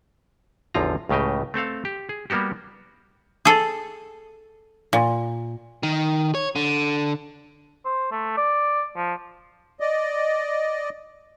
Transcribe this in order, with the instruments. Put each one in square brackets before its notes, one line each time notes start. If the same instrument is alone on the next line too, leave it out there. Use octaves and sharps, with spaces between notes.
[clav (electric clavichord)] A1 E2 D3 F3 F4 A#5
C#2 A2 C#3 G4 D#5
A3 C4 A4 F5
G4
G#4
G3 A#3 B3 F#4 G4
[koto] G#4 A4
A#2
[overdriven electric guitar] D#3
C#5
D3
[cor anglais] C5
A3
D5
F3
[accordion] D5 D#5